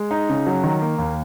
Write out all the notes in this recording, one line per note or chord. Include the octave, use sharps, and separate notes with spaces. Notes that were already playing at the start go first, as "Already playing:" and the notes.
Already playing: G#3
D#4
C#3
F#3
D#3
A#3
D#2